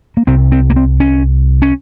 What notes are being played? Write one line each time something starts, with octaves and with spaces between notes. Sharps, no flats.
A#3
C2 C3 C4
C4
A#3
C4
C#4
C#4